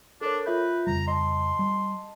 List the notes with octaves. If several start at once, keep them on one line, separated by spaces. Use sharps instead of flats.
D4 A4 A#4 C#5
F4 B4 E5 G6
F2 C#3 G3 A#5
D#5 A5 C6
G3